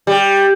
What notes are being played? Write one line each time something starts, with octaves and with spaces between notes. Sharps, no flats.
G3